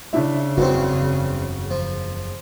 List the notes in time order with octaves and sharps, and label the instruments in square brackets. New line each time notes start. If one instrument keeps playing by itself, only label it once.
[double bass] C#3 [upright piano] D4 E4 E5
[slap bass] F#1 E2 [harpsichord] G2 C4 [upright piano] F#4
[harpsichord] F3